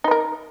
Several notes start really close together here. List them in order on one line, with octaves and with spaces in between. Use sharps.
D#4 B4 A#4